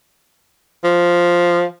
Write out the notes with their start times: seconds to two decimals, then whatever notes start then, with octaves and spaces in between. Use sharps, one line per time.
0.84 F3